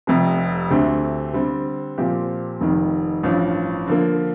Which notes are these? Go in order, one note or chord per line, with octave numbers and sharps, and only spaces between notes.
F1 F2 C3
D2 D3 A3 C4 G4
D3 G3 C4
A#2 F3 C4 G4
F1 F2 D#3
A1 G2 F3
D3 F3 A#3